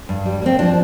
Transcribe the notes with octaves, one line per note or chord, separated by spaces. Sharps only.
G2
G3
A#3 C4
F3 D4